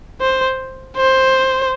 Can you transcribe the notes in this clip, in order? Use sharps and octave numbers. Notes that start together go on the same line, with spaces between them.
C5
C5